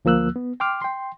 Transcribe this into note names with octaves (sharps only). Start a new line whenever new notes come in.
D2 F3 A#3 E6 F#6
B3
G5 C6 D6 F6
G5 C6